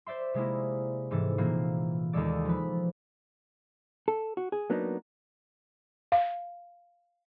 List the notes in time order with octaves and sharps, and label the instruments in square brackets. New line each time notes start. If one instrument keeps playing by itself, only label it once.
[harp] C5 D5 E5 C6
C3 G#3 A#3 E4
G#2 C3 E3 A4
A#2 E3 A#3 C4
D#2 D#3 G#3 A4 D5
F3 B4
[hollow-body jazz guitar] A4
F#4
G#4
F#3 A#3 B3 D4 D#4
[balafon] F5